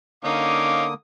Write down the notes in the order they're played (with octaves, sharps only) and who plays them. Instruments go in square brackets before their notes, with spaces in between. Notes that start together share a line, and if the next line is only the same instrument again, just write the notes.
[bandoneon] D3 A#3 D#6 [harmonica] C#4 D#4 F5 [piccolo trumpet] D6